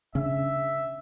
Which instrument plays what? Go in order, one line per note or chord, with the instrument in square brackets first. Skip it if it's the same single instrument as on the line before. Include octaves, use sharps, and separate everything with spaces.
[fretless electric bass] C#3 C#4 D4 [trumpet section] E5